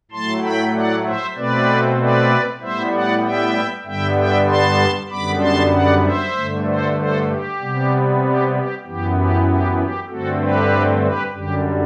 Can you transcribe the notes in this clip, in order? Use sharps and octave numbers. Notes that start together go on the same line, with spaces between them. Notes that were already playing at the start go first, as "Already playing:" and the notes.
A2 F#3 A3 A5 C6
G5 B5
D5 F#5
C5 E5
B2 A3 C4 B4 D5
B4 D5
A2 G3 B3 C5 E5
D5 F#5
E5 G5
G2 D3 G3 B3 E5 G5
E5 G5
A5 C6
F#2 D3 G3 B3 B5 D6
A5 C6
D5 F#5
C5 E5
G2 D3 A3
A4 C5
A4 C5
G4
C3 G3 B3
G4
G4
F#2 E3 B3 G4
G4
G4
G4
G2 D3 A3 C4 F#4 A4
G4 B4
G4 B4
F#2 D3 G3 G4